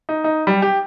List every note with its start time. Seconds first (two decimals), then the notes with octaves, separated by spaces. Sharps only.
0.09 D#4
0.24 D#4
0.47 G3
0.62 G4